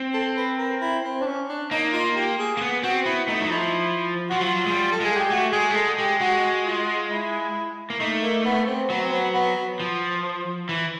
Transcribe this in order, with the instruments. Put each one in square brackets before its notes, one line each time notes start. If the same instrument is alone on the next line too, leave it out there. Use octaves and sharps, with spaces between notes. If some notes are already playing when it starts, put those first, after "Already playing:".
Already playing: [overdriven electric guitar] C4
[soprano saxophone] A4
B4
A#4
E4
C4
D4
C#4
D4
[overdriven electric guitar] A#3 [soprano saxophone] D#4
[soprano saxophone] F4
G4
G#4
[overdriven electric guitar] A#3
B3
[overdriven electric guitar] C4 [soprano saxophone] F#4
[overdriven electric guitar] B3 [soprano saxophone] E4
[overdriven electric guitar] A3 [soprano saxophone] D#4
[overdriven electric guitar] F#3
[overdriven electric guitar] F3 [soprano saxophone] E4
[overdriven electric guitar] F3 [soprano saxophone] F#4
[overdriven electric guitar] F#3 [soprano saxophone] F4
[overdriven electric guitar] G#3
G3
[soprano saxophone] A4
[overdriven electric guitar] G#3 [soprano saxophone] G#4
[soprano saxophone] G4
[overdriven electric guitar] A3 [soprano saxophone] F#4
[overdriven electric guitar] G#3 [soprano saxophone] G#4
[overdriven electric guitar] A3
[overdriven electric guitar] G#3 [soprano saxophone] A4
[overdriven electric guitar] G#3 [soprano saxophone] G4
[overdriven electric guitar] G#3 [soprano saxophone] F#4
[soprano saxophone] F4
E4
[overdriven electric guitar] A#3
[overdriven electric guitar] A3 [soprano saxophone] D#4
[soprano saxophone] A#3
B3
C4
[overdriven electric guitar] F#3 [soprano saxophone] B3
[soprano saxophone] C4
B3
B3
[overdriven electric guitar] F3
E3